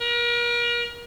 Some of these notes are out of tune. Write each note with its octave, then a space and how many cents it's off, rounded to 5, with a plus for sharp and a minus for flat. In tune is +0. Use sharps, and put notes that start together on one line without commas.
A#4 +35